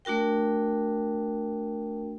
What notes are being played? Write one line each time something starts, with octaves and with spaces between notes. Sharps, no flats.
A3 D4 F#4 A#4 G5